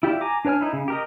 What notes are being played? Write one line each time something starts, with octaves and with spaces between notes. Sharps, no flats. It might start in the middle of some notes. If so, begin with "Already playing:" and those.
E4 F4 G4 D5 E5
G#5 A#5 D6
D4 B4 C#5 G#5 F6
D#4 E4
C#3
G4 A#4 D#5